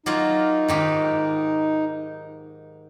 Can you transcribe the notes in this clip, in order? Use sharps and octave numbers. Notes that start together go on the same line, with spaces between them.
F#3 A#3 D#4 F4
G#2 D#3 G4